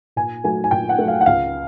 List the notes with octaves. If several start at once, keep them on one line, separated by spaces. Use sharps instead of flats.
A#2 G#5
F#3 A3 G#5
G#5
A#2 G5
F#5
F#3 A3
F5
F#5
C#2 F5